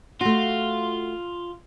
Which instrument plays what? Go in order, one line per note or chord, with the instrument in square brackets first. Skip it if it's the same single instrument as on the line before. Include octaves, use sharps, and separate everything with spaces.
[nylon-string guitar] A3 F#4 [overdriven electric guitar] F4